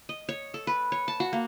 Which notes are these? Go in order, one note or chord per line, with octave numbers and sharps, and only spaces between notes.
D#5
C#5
A4
B4
C#5
A5
F#4
A#3